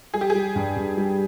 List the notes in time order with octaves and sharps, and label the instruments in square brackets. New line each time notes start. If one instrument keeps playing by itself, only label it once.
[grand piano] G3 [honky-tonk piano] G#4
[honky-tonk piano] G4
[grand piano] G3 [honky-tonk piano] G#4
[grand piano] G2
G2
G3